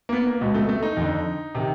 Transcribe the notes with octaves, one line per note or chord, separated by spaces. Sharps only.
A#3
B3
A#3
C#2 B2
A3
A3
D#4
F2 D3
C3 D#3